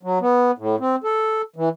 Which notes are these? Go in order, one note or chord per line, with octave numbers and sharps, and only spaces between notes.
F#3
B3
A2
C4
A4
E3